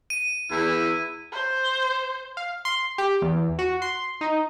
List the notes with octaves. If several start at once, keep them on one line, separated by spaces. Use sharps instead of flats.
D#7
E2 E4
C5
F5
C6
G4
E2
F#4
C6
D#4